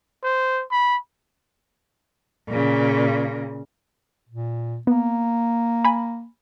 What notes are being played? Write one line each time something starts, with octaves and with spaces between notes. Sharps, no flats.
C5
B5
A#2 C#3
A#2
A#3 B3
G#5 B5